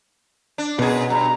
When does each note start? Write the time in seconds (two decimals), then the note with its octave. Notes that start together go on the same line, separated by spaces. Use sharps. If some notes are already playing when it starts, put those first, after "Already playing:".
0.58 D4
0.79 F#2 B2 G#4
1.10 G2 A#5